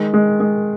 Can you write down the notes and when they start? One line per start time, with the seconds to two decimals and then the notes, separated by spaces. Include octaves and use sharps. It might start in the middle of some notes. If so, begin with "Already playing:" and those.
Already playing: D#3 G#3
0.14 G#3
0.40 G#3